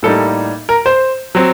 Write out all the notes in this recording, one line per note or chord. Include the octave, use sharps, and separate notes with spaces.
A2 G3 A#3 D#4 A4
A#4
C5
F#3 C4